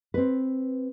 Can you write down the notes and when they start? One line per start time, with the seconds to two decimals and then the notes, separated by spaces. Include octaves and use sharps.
0.14 C4 B4